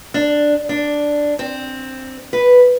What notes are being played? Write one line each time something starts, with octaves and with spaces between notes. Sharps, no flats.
D4
D4
C4
B4